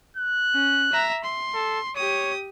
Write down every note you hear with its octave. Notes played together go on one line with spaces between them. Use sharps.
F#6
C#4
E5 A#5
C6
A4
G4 C#5 D#6